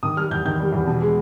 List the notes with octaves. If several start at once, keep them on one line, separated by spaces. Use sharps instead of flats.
D#3 D#6
G3 F6
E2 G6
D#3 G6
G3
E2
B2
G#3